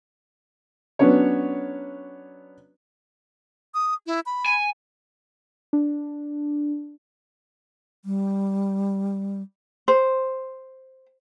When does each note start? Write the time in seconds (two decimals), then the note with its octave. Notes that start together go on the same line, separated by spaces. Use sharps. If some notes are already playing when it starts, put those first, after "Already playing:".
0.99 F#3 B3 C#4 D4 C#5
3.74 D#6
4.07 E4
4.26 B5
4.46 G#5
5.73 D4
8.05 G3
9.88 C5